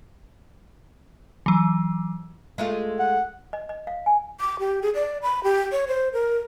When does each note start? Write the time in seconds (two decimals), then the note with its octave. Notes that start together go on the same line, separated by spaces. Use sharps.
1.46 E3 F#3
2.58 G#3 A3 F4
2.99 F#5
3.53 D#5
3.69 D#5
3.87 F5
4.06 G#5
4.40 D6
4.59 G4
4.82 G#4
4.95 D5
5.22 B5
5.44 G4
5.72 C#5
5.88 C5
6.13 A#4